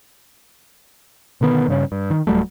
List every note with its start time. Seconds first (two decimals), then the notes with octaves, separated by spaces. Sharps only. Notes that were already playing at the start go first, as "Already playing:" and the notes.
1.41 B2 D3 D#3 B3
1.68 G2 C#3 C#4
1.92 G2
2.10 D#3
2.27 D1 F#3 G3 A3